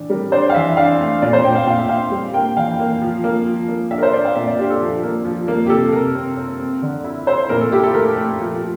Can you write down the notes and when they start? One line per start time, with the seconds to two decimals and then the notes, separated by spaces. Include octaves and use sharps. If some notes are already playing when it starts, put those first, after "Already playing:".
Already playing: A2 E3 D4
0.10 G3 A#4
0.32 D4 C5
0.50 F5
0.54 E3 E5
0.77 D4 F5
1.00 A3
1.22 A#2 D5
1.33 C5
1.44 A#2 G5
1.55 F5
1.66 A#2 F5
1.78 E5
1.89 A#2 F5
2.11 G3
2.34 A#3 G5
2.57 E3 F5
2.80 A#3
3.02 F3
3.24 A#3
3.46 F3
3.68 A#3
3.91 D4 E5
3.98 A#4
4.03 C5
4.13 D4 D5
4.25 F5
4.35 A#2 E5
4.47 D5
4.58 D4 G4
4.70 A4
4.81 F3
5.03 A#3
5.25 F3
5.48 A#3
5.66 G4
5.70 C3 A4
5.93 C3 A#4
6.15 C4
6.37 C4
6.59 C4
6.82 D3
7.04 E4
7.27 E4 C5
7.49 A#2 A#4
7.61 A4
7.72 E4 G4
7.84 A4
7.94 A3 A#4
8.16 A3
8.39 F3
8.61 F3